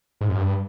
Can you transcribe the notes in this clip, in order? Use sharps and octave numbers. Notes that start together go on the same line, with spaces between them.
G#2
F#2
G2